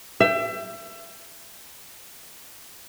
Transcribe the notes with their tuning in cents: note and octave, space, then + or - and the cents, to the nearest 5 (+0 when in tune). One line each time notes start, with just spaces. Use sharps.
E5 +30 G5 +5